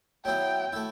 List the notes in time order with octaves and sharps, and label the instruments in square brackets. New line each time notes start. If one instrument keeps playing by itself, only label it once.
[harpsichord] F#3 B3 E4 [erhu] G5
[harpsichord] A3 E4